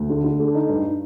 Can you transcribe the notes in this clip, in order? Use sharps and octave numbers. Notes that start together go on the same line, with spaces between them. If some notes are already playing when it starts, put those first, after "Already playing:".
Already playing: D2
D3
D3
A3
D#4
G2